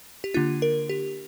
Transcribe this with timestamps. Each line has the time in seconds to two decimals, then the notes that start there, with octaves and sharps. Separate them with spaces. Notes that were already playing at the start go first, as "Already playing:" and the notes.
0.24 G4
0.34 D3 A#3 D4 F4
0.62 A#4
0.89 G4